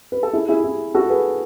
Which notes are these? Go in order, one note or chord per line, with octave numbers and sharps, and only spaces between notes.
B4
A4
E4 G#4
E4 G#4
E4
F#4 A4
G#4 B4